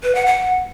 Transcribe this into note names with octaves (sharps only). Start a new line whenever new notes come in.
B4
F#5
F#5